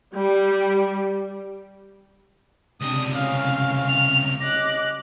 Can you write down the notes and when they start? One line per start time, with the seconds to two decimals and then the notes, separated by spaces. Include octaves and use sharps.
0.12 G3
2.81 C#2 C3 D4 D#6
3.14 A2 C4 C#4 F5
3.89 F7
4.40 G3 C#4 D#5 D6 F#6 A#6